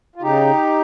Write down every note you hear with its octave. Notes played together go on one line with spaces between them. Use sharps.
F4
C#3 D#4 G4